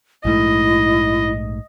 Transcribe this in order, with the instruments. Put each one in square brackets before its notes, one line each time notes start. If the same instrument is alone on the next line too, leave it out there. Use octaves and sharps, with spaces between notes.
[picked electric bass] A#1 G#2 A3 [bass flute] E4 [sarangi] D#5